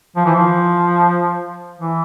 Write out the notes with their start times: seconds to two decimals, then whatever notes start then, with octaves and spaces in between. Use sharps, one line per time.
0.16 F3
0.26 E3
0.36 F3
1.79 E3